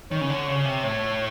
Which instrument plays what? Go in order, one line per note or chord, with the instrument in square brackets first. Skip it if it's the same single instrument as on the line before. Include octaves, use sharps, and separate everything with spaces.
[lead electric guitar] D#3 [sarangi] C#5
[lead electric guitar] C#3
D3
C#3
C3
[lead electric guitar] A2 [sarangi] C#5